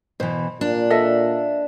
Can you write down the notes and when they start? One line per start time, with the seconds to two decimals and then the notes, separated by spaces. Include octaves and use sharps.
0.20 B2 E3 C5
0.61 A#2 D4
0.90 A4 D#5 E5